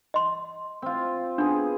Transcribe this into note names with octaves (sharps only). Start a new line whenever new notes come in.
D#5 C6
C4 F4
B3 D4 G#4